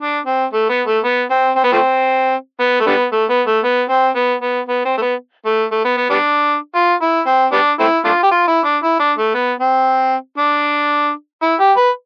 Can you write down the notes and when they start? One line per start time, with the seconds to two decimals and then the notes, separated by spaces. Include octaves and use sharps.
0.01 D4
0.26 C4
0.53 A3
0.69 B3
0.87 A3
1.04 B3
1.31 C4
1.56 C4
1.64 B3
1.72 F3 A3 C4
2.60 B3
2.81 A3
2.87 D3 G3 B3
3.12 A3
3.30 B3
3.47 A3
3.64 B3
3.90 C4
4.16 B3
4.42 B3
4.68 B3
4.85 C4
4.97 A3
5.02 B3
5.46 A3
5.72 A3
5.85 B3
5.98 B3
6.10 G3 B3 D4
6.75 F4
7.02 E4
7.27 C4
7.53 G3 B3 D4
7.80 A3 C4 E4
8.05 A3 D4 F4
8.23 G4
8.31 F4
8.48 E4
8.65 D4
8.83 E4
9.00 D4
9.18 A3
9.35 B3
9.60 C4
10.38 D4
11.43 E4
11.60 G4
11.77 B4